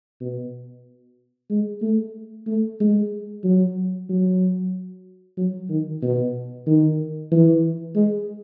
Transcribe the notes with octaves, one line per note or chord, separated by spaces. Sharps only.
B2
G#3
A3
A3
G#3
F#3
F#3
F#3
D#3
B2
D#3
E3
G#3